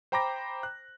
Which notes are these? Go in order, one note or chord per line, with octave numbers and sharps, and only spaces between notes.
C5 G5 A#5 B5 D6 A#6
F#6